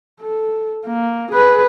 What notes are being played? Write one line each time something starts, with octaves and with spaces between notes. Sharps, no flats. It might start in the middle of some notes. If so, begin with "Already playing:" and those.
A4
A#3
G#4 B4